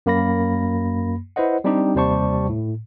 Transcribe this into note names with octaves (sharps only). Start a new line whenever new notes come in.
F#2 A#3 B5 A#6
E4 B4 C5 D#5 F#5
G3 C4 D4 D#4 G4
D#2 C3 G3 C5 A5 C#6
A2